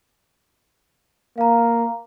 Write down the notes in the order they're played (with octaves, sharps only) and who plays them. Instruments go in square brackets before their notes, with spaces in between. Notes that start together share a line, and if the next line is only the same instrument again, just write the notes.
[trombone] A#3 [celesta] F5 A#5